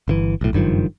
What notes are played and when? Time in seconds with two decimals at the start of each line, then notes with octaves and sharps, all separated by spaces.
0.08 G1 C#3 E3
0.41 B1 A2
0.53 F#1 G2 D#3 F3